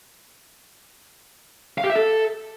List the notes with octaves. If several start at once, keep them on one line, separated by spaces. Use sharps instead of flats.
F5
G4
E5
A4